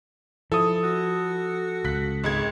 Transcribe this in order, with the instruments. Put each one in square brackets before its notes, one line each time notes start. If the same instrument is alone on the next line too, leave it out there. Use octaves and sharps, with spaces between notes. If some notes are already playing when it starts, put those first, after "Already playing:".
[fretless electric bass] F3 [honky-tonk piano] E4 [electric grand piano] A4 D#6
[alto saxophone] F#4
[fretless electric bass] C#2 [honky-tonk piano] F#6 B6
[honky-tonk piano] G#1 G#3 G#6